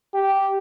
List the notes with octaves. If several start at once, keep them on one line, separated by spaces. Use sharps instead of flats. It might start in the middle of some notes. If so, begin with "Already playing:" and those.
G4